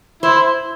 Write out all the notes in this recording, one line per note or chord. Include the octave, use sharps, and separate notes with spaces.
E4 C5